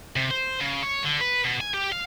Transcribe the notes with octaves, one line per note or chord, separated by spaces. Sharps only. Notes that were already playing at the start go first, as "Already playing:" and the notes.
C3
C5
C#3
C#5
D3
B4
B2
G#5
G4
F5